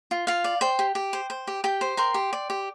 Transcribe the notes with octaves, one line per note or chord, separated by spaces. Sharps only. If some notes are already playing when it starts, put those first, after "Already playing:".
F4
F4 F5
D5
C5 G5
G4
G4
C5
C5
G4
G4 G5
C5
A#4 G5 C6
G4
D5
G4